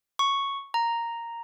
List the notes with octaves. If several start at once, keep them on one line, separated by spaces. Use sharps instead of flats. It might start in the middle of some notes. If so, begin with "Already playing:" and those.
C#6
A#5